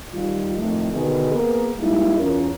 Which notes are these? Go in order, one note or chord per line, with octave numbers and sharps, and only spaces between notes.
D#3 G3 F4
F2 A2 D#3 A3
B2 D3 D#3 B3 G#4
A#3 B3 G#4 A#4
G3 G#3 A#3 D#4 E4
E2 C#4 F4 A#4